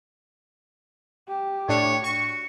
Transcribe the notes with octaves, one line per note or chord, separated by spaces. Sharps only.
G4
A2 D4 C#5
F#4 C#6